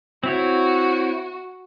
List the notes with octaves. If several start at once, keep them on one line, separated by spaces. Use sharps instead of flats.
C4 E4 F#4 C#5